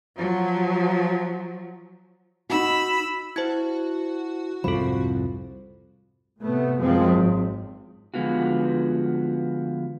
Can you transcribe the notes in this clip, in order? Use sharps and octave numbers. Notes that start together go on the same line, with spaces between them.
F3 F#3
D#4 F#4 B5 E6
E4 F#4 C5 A5 G#6
C2 F2 G#2 F3 A4 B5
A2 C3 A3 B3
F#2 F3 G#3 C4
G#1
D3 F3 G#3 B3 F4 F#4